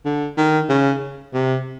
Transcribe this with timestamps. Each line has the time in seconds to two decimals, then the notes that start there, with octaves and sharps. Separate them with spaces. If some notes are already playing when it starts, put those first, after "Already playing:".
0.05 D3
0.37 D#3
0.69 C#3
1.33 C3